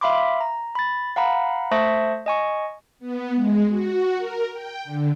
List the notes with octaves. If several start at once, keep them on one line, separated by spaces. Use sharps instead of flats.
E5 F5 B5 C6 D6
A#5
B5 A6
F5 F#5 A#5 B5
A3 C5 E5 A5 C#6 A#6
D#5 G#5 C#6
B3
G#3
F#4
A#4
G5
D3